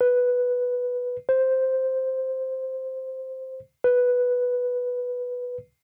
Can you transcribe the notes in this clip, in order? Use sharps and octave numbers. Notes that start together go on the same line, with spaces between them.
B4
C5
B4